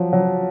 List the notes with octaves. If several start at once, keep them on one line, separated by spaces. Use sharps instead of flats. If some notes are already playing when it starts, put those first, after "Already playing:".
Already playing: F3 F#3
F#3